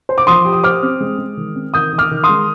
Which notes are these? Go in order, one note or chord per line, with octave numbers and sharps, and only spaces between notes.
C5
D6
F3 C6 D#6
G4
D#6
C5 D6 F6
C4
G#3
G#3
D#3
C4
D#3 D#6 G6
D#3
D6 F6
D#3
C6 D#6
G#3